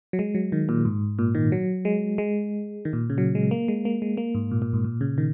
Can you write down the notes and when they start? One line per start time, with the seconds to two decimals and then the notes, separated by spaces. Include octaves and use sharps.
0.13 F#3
0.19 G#3
0.35 F#3
0.52 D#3
0.69 A#2
0.85 G#2
1.19 A#2
1.35 D#3
1.52 F#3
1.85 G#3
2.18 G#3
2.85 D#3
2.93 A#2
3.10 C#3
3.18 F#3
3.35 G#3
3.51 A#3
3.68 G#3
3.85 A#3
4.02 G#3
4.17 A#3
4.35 G#2
4.51 A#2
4.62 A#2
4.73 G#2
4.84 A#2
5.01 C#3
5.18 D#3